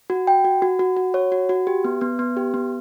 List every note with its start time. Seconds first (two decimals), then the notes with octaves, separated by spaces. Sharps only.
0.10 F#4
0.27 G5
0.45 F#4
0.62 F#4
0.79 F#4
0.97 F#4
1.14 C#5
1.32 F#4
1.49 F#4
1.67 G4
1.84 B3
2.01 B3
2.19 B3
2.37 G4
2.54 B3